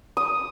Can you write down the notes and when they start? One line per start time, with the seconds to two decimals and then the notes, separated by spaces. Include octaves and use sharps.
0.17 D#6